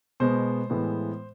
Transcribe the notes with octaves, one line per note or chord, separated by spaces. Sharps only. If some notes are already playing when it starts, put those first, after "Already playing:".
B2 G#3 B3 C5
A2 E3 G#3 B3